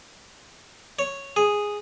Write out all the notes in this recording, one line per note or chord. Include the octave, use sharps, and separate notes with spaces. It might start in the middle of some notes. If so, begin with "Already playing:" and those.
C#5
G#4